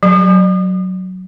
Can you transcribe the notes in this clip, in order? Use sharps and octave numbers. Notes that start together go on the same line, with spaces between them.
F#3